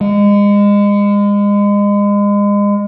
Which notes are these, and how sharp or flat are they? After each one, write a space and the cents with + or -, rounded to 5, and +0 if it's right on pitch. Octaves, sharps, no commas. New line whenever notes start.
G#3 -30